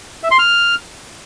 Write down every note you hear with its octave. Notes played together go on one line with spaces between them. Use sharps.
E5
C6
F6